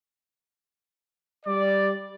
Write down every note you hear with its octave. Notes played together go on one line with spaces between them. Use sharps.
G3 D5